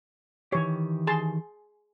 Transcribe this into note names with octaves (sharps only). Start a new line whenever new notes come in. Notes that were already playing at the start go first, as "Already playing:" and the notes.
D#3 E3 G4 C#5
G#4 A5 C6